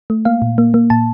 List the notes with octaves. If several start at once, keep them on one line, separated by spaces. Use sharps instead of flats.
A3
A#3 F5
A#2
A#3
A#3
A#2 A5